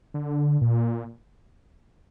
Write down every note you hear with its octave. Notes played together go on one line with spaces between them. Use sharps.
D3
A#2